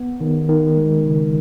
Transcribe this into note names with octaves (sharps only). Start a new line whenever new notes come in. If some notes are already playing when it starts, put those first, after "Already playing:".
Already playing: B3
D#3
D#3
G#3
C#3